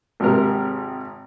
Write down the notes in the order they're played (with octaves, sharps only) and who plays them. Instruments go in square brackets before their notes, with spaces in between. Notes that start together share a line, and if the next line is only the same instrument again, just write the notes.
[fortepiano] G#1 C3 A#4